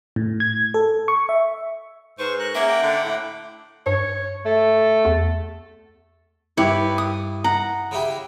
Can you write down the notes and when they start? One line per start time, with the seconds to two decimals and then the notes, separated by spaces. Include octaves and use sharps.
0.16 A2
0.40 G#6
0.74 A4
1.08 C#6
1.29 E5
2.19 G#2 B4 C5 C#6
2.39 A#4 C#6 F#6
2.55 A#3 C#4 G#4 E5 F#5
2.67 F#5 G5 D6
2.83 D3
3.03 A2
3.86 G2 C#5
4.46 A3
5.05 E2
6.57 G2 E4 G4 B4 C#5
6.98 D#6
7.44 F#5 A#5
7.91 C#3 E4 G4